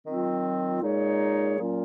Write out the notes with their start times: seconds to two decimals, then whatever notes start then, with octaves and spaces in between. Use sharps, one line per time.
0.06 D#3 F#3 C4 F4
0.82 A#2 G#3 D#4 G#4 C#5
1.58 A#2 F#3 A#3 C#4 F4